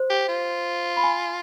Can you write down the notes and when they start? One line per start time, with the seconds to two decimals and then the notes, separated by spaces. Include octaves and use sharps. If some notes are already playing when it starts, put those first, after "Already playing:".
Already playing: C5
0.10 G4
0.28 F4
0.97 B5
1.03 G#5